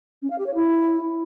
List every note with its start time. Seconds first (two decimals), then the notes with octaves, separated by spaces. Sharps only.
0.22 C#4
0.30 F5
0.38 G4
0.46 C#5
0.54 E4